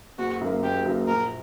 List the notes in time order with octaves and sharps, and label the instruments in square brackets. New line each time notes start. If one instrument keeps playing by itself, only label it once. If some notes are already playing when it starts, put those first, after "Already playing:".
[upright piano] F#1 [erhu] F#4
[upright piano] F#2 F#3 A#3
[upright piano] F#1 [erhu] G4
[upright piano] F#2 F#3 A#3
[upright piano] A#1 [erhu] A#4